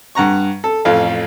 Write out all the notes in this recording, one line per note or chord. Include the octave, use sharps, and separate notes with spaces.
G2 F#5 A#5 C#6
A4
A1 F2 F5